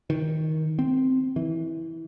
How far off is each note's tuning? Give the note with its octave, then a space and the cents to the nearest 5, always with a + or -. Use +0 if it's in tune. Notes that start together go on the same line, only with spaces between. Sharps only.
D#3 +15
C4 -10
E3 -15